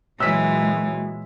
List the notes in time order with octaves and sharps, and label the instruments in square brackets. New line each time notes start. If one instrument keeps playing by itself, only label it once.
[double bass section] A#2 F#3 G#3 [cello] E3 [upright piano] E6 B6